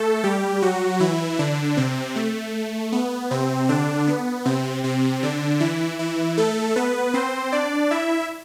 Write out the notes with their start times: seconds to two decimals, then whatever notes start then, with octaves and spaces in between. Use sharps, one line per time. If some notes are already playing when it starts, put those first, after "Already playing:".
Already playing: A3 A4
0.24 G3 G4
0.62 F#3 F#4
1.00 E3 E4
1.39 D3 D4
1.77 C3 C4
2.16 A3
2.92 B3
3.31 C3 C4
3.69 D3 D4
4.07 B3
4.45 C3 C4
4.84 C3 C4
5.23 D3 D4
5.60 E3 E4
5.99 E3 E4
6.37 A3 A4
6.76 B3 B4
7.14 C4 C5
7.52 D4 D5
7.91 E4 E5